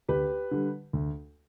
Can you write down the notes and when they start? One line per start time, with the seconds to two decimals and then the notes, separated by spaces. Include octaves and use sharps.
0.08 D2 G4 B4
0.51 D3 G3
0.93 D2